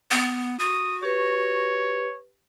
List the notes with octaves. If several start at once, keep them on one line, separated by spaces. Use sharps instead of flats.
B3
F#4 D#6
G4 B4 C#5